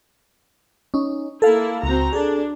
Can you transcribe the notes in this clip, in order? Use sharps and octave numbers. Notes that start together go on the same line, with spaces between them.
C#4 D#4
A#3 E4 A4 F5
C#2 C4 F#4 A#5
D4 G#4 A4